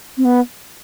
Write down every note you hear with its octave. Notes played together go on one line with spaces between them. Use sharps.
C4
B3